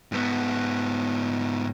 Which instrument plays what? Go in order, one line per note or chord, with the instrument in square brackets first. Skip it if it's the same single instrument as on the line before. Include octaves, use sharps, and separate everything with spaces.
[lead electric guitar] G#2 B3